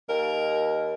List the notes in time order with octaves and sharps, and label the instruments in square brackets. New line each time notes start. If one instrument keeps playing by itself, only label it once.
[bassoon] D#2 [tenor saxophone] A#4